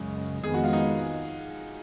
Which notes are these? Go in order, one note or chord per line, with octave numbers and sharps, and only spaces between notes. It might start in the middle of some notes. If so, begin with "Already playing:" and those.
Already playing: F#2 C#3 G#3
F2 D#3 G#3 B3 G#4
F#4
F4
D#4